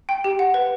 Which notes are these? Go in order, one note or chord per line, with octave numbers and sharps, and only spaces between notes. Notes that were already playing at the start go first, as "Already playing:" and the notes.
G5
G4
F#5
B4